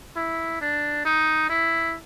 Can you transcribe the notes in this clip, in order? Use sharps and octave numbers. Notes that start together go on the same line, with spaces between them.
E4
D4
D#4
E4